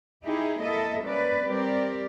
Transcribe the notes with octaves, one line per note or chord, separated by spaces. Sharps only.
D#4 E4 G4 G#4
A#3 E4 A4 D#5 E5
G3 A#3 C#4 B4 D5
G3 C4 G4 A#4 D5